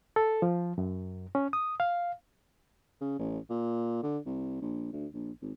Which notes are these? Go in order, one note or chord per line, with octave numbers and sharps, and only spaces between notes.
A4
F3
F#2
C#4
D#6
F5
C#3
A1
A#2
D3
C2
A#1
D2
A#1
G#1